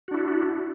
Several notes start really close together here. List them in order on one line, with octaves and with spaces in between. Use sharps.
F#4 D4 E4